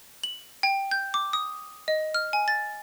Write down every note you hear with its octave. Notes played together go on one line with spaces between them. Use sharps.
F#7
G5
G6
D6
D#6
D#5
F6
G#5
A6